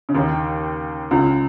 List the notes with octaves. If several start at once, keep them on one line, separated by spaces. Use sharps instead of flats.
C#3
D#2 D#3
C#2 C#3